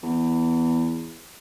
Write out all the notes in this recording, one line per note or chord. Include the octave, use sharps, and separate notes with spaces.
E2